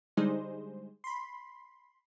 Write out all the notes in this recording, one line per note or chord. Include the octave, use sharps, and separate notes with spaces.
D3 G3 G#3 D#4 G#4 C5
B5 C6